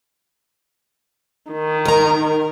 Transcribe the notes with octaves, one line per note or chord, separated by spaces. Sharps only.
D#3
A#4 A#5